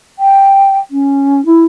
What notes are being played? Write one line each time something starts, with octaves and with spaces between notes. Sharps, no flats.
G5
C#4
E4